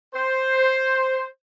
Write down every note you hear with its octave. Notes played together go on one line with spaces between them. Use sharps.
C5